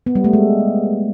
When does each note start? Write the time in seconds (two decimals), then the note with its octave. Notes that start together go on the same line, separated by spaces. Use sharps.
0.06 B3
0.15 G3
0.24 A3
0.33 G#3